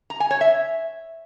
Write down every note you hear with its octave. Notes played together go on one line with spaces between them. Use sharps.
A#5
G#5
C#5
E5